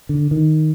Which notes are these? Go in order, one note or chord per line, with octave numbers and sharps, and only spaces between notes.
D3
D#3